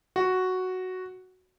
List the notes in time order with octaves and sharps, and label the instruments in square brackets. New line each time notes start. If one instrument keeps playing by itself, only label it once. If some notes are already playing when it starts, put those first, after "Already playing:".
[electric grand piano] F#4